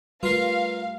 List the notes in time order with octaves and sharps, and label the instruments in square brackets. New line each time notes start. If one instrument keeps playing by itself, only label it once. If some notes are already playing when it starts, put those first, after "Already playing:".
[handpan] G3 A3 [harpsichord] F4 A#4 [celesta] B4 C7 [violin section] F5